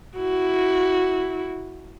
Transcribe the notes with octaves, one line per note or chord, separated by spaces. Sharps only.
E4 F#4